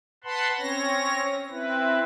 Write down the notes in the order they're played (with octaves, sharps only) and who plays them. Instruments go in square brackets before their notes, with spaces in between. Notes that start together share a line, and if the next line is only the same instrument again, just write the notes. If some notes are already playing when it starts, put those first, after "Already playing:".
[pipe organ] B4 F#5 A5 B5 C6
C4 C#4 C#5 A#6
C4 E4 B4